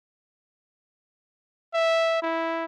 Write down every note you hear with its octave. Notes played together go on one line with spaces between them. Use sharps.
E5
E4